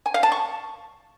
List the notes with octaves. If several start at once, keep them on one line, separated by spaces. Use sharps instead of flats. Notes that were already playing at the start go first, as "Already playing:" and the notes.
G#5
F5
A5
C#6